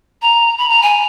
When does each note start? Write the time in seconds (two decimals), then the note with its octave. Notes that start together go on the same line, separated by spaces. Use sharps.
0.22 A#5
0.58 B5
0.69 A#5
0.82 G#5